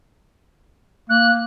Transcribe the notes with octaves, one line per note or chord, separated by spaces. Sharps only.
A#3 F#6